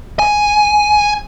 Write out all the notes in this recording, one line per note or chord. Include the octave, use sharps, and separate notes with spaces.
G#5